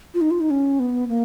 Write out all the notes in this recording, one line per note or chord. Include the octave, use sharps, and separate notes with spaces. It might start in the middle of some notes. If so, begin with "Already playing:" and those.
F4
D#4
F4
D#4
C#4
B3
A#3